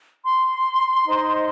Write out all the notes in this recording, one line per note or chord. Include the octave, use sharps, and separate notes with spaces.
C6
D#4 C5